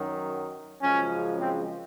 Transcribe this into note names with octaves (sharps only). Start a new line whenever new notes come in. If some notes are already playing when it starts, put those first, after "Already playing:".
Already playing: F#2 D#3 F#3
F#2 C#3 F3 G#3 C#4
C4